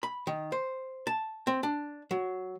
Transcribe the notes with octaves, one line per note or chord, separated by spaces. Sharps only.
B5
D#3
C5
A5
C4
D4
F#3